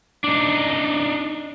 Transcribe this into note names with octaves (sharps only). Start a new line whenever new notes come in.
D4 D#4